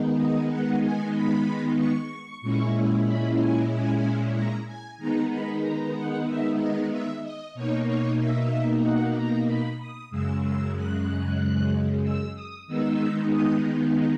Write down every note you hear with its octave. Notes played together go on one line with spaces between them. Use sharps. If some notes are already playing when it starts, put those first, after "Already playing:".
Already playing: D#3 G#3 B3 D#4
D#5
F#5
G#5
B5
C#6
A#2 G#3 C#4 E4
B5
G#5
G#5
A#5
G#5
D#3 G#3 B3 D#4 A#5
B5
A#5
F#5
E5
D#5
E5
D#5
B2 A#3 D#4 C#5
C#5
E5
F#5
A#5
B5
D#6
F#2 C#3 G#3 E6
E6
F#6
E6
D#6
D#3 G#3 B3 D#4 E6
D#6